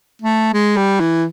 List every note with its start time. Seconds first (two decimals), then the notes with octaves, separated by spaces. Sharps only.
0.22 A3
0.54 G#3
0.77 G3
1.00 E3